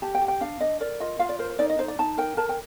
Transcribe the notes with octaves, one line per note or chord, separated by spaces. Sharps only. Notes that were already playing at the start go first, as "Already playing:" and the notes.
G4 A5
G5
G4
G5
D4 F5
D4 D#5
A#4 D5
F4 D#5
F4 F5
D5
A#4 C5
C5
D#4 D5
D#5
D#4 C5
D5
D#4 A5
A#4 G5
A#4 A5
G5